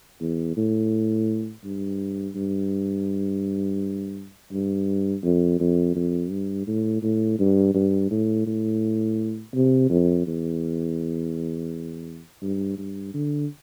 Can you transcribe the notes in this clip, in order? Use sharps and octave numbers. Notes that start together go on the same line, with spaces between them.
E2
A2
G2
G2
G2
F2
F2
F2
G2
A2
A2
G2
G2
A2
A2
C3
F2
E2
G2
G2
D3